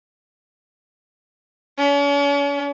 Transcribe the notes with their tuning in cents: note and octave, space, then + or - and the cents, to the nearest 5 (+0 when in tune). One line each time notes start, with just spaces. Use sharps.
C#4 +40